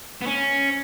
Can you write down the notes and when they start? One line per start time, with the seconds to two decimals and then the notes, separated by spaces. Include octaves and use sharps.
0.22 B3
0.27 C#4